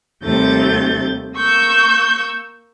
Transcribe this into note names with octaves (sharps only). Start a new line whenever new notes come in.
D#2 C3 G3 A3 G6 A6
A#3 C#6 E6 G6